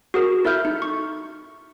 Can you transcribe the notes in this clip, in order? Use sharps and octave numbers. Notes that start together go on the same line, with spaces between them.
F#4 G#4 A#4
E4 A4 E5 F6 G6
D#4
C#6